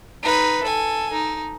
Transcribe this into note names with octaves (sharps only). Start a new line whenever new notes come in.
D#4 B4
A4 G#5
D#4